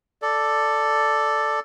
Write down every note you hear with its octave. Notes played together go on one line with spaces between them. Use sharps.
A4 D5